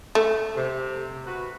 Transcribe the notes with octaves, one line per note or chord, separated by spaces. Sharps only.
A3
C3
F#4 B4